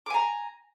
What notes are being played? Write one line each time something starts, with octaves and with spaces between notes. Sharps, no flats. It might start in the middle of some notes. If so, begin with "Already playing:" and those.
G#5 A#5 D6